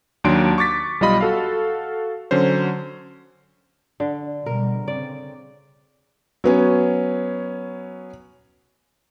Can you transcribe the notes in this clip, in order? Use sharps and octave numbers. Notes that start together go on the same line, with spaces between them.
D#2 F#3 D4 C6 D7
C#6 D6 A6 B6
B1 G3 F4 D#5 B5
F#4 A4 F5
D3 F#3 C#4 C5
D3
B2 G3 A#4
C#3 C4 D5
F#3 B3 C#4